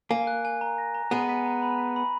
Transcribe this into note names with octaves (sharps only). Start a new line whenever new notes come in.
A#3 G#5
F#6
G#5
A#5
A#6
A#5
G#3 B3 D#7
B6
A#5
B5
B6
B5